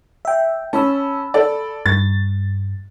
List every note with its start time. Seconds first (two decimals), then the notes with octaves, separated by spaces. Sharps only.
0.25 E5 G5
0.73 C#4 A5 B5 E6
1.34 A4 D5
1.86 G2 A6